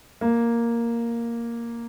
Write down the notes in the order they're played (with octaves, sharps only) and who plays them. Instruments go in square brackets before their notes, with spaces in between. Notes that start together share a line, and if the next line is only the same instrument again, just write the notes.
[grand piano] A#3